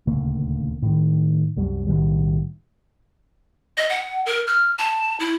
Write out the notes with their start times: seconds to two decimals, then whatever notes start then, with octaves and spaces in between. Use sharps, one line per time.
0.07 D#1 D2 C#3 A#3
0.82 A2 D#3
1.56 C2 F#2 G3
1.87 B1 A2 D#3 G3
3.78 D#5
3.89 F#5
4.26 A#4
4.47 F6
4.79 A5
5.20 E4